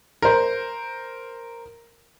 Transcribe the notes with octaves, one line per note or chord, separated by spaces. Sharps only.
A#4 C5